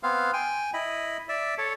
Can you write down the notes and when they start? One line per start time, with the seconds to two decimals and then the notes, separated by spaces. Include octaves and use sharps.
0.03 B3 C4 F5
0.33 G5 G#5
0.74 E4 D#5 B5
1.29 D5 E5
1.58 A4 C#5